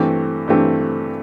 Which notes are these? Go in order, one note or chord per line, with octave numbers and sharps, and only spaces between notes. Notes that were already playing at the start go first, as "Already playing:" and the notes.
Already playing: G2 E3 A3 C4 G4
G2 E3 A3 C4 G4